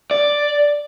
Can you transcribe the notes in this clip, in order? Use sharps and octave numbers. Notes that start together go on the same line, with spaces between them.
D5